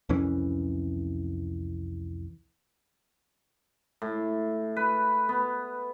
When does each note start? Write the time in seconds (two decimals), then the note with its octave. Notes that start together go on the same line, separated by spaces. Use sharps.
0.09 C2 F2 E3 C#4
4.02 A2
4.76 B4
5.29 B3